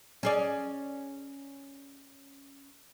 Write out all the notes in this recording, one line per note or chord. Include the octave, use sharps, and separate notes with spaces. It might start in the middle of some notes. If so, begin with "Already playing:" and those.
C#4 G#4 D5